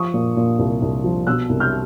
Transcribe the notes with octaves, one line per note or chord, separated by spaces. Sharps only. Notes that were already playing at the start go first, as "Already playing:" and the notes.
Already playing: F3 C#6 D#6
A#2
A#2
C2
C2
F3
B2 E6 F#6
C2
F6 G6